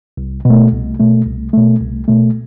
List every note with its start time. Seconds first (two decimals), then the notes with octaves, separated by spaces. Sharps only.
0.17 C2
0.45 B2
0.50 A3
0.72 C2
1.00 B2 A3
1.26 C2
1.53 B2 A3
1.81 C2
2.08 B2 A3